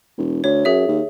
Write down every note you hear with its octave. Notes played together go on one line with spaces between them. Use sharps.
E1
D2 C#5
F#2 G#4 E5
D#2